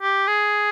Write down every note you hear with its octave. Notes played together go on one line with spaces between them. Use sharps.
G4
G#4